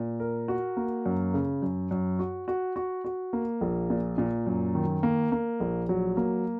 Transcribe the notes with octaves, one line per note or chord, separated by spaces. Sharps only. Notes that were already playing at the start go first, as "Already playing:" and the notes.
Already playing: A#2
A#4
F#4
A#3
F#2
C#3
F#2
F#2
F#4
F#4
F#4
F#4
A#3
A#1
A#2
A#2
F#2
D#3
A#3
A#3
A#1
F#3
A#3